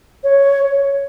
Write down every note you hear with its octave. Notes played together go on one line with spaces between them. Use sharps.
C#5